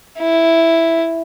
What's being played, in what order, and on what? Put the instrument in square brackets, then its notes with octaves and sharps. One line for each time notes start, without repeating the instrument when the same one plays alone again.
[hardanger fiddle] E4